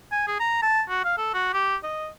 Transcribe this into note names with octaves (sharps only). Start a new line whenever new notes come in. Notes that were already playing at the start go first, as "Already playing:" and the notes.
G#5
G#4
A#5
A5
F#4
F5
A4
F#4
G4
D#5